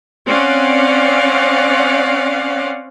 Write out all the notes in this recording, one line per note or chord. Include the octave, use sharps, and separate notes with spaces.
C4 C#4 D5 F5 F#5